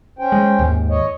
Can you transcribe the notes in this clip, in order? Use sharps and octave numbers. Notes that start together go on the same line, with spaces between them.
C#4 C5 G5
G#3
D#2 G#2
C#5 D#5